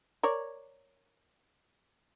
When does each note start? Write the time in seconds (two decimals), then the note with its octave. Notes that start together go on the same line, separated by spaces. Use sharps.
0.23 A#4 C#5 D5